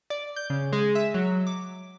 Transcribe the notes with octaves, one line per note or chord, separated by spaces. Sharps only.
D5
G6
C#3
G#3
E5
F#3
D6